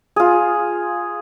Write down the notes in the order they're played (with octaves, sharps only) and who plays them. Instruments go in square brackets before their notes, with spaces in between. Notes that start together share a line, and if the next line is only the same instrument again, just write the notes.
[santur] F4 G#4